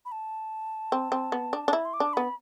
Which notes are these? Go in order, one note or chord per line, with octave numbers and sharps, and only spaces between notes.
B5
A5
C4
C4
B3
D4
D4
E4 B5
C6
D6
D4
B3 B5